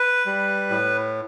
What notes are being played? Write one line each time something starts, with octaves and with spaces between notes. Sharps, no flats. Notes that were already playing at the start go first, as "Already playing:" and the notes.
Already playing: B4
G3
A2